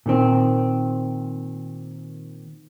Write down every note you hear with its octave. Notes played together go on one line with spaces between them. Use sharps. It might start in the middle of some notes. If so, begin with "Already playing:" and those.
A#2 D#3 C4